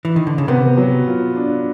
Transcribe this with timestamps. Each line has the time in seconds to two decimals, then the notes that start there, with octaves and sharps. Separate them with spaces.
0.05 E3
0.16 D#3
0.27 D3
0.38 C#3
0.48 C3 B3
0.77 F#3
1.07 F4
1.36 D4